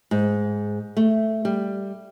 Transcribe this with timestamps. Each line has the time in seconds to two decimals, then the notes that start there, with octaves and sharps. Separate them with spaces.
0.11 G#2
0.97 A3
1.45 G3